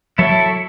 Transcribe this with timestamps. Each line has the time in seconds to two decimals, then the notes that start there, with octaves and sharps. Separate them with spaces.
0.18 F#3 E4 A4 C#5 E5